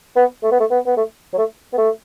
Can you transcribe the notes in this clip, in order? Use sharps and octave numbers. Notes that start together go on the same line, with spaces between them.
B3
A3
B3
A3
B3
B3
A3
F#3
A3
B3
A3